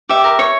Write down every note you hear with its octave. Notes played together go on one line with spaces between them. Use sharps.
G4 E5
A#4
C#5